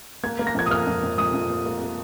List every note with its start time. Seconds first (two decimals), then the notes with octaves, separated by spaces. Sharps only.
0.23 A#3 G#6
0.39 A#3
0.47 A#6
0.55 F2 G#6
0.66 D#6
0.71 A#3 F6
0.87 F2
1.03 F2
1.18 F2 D#6
1.34 F2
1.50 A#3
1.66 A#3
1.81 A#3